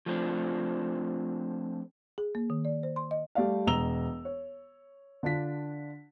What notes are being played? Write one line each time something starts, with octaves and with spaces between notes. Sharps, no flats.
F3 A3 C4 D4
G#4
A#3
D#3
D5
C5
C6
D#5
G3 A3 D5 F5
E1 G#3 A#5 E6 F7 G7
C#5
D3 D4 F4 B6